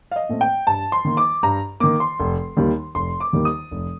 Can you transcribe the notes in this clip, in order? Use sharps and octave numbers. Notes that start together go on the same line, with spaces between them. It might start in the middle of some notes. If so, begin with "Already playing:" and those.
F5
D#5
A#2 A3 C4
G5
G2 A5
C6
D#3 A#3
D6
G2 A#5
D#3 A#3 D6
C6
F1
D#2 D#3 G3 A#3
F1 C6
D6
D#2 D#3 G3 A#3
D#6
F1